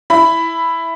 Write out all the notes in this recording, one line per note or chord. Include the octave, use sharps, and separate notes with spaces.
E4 B5